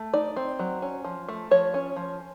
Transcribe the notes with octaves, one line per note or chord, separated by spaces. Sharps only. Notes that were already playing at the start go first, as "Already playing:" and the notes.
Already playing: A3
D#4 D5
C4
F#3
C#4
F3
A3
F3 C#5
C#4
F3